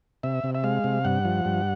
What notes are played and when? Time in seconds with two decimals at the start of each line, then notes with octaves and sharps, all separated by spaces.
0.23 C3 E5
0.44 C3
0.55 E5
0.64 G#3 F5
0.84 C3
1.05 G2 F#5
1.25 F3
1.45 G2